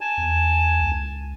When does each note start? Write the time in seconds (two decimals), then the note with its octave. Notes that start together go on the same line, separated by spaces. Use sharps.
0.01 G#5 A5
0.18 E2
0.80 C#2